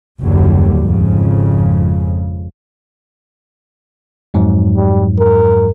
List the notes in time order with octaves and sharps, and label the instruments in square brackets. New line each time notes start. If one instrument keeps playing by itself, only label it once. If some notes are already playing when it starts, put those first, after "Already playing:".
[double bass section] F#1 D#2 D3 F#3 G3
G#1 F2 C#3
[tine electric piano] F2 G#2 F#3
[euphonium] G3
A#4